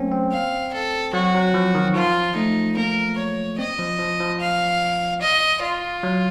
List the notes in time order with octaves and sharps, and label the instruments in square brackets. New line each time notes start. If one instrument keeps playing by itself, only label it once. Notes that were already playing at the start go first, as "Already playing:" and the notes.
Already playing: [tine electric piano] F#3 A3 A#3 C4 C#4
C4
[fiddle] F5
A4
[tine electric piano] F#3 [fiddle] F#4
[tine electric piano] F#3
F3
D#3
[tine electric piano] F3 [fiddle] F4
[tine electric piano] A3 [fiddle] D#4
[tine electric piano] A#3 [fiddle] A#4
[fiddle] C#5
[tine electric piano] C4 [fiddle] D#5
[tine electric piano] F3
F3
F3
[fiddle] F5
D#5
F4
[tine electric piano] F#3